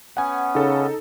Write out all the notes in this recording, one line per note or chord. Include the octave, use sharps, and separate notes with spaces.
B3 C#4 F#5 G#5
C#3 D#4 A4